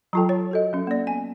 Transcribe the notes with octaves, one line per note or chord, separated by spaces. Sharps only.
F#3 F4 A4 G5 A5 A#5
C#5
F#4 A4 D#5
F#3 C#4
A#3 D5
B3 G#5